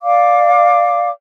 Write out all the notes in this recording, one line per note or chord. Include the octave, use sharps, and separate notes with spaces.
D5 F5 D6